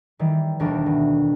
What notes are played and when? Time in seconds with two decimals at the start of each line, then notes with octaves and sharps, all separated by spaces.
0.19 D#3 E3 G3
0.59 E1 D2 E3 G3 D4 A#4
0.86 B2